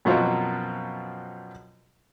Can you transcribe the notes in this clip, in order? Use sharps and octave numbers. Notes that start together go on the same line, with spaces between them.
F#2 B2 F3 F#3 C4 F4